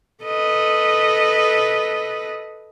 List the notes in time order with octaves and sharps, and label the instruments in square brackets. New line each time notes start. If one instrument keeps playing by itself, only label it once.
[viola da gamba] A4 B4 D#5